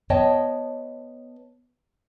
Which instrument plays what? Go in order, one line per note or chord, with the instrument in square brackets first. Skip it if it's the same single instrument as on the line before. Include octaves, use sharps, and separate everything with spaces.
[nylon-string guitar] B3 C#5 D#5 G5 A5